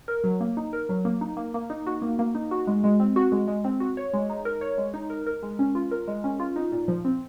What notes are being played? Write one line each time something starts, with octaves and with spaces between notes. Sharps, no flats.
A#4
F#3
A#3
D#4
A#4
F#3
A#3
D#4
A#3
A#3
D#4
F#4
A#3
A#3
D#4
F#4
G#3
G#3
C4
F#4
G#3
G#3
C4
F#4
C#5
G#3
D#4
A#4
C#5
G#3
D#4
A#4
A#4
G#3
C#4
F4
A#4
G#3
C#4
F4
D#4
A#2
F3
C4